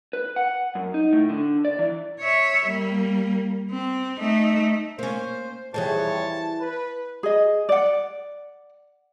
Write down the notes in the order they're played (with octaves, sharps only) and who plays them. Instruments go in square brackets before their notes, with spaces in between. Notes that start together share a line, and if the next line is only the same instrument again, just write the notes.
[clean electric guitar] B4
F#5
F#2
D#4
A2
D3
D5
E3
[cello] C#5 E5
G3 A#3
C4
A3 D#4
[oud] A#3 C#4 [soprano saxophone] C5
[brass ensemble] F2 G3 C#5 [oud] E3 G#4 C5 [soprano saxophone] A5
[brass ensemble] B4
[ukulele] G#4 D#5
D5 F#5